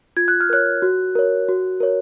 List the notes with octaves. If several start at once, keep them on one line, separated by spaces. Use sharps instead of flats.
F4 G#6
F#6
F6
A#4 C#5 F#6
F#4
A#4 C#5
F#4
A#4 C#5